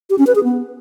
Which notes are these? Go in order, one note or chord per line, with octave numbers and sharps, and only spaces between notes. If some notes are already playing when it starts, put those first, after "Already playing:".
G4
C#4
B4
G#4
B3